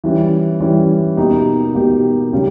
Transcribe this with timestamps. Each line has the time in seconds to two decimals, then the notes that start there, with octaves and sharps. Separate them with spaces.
0.04 E3 G3 C#4
0.60 E3 G3 C#4
1.17 B2 A#3 D#4 G4
1.75 B2 A#3 D#4 G4
2.32 C#3 G3 C#4 G4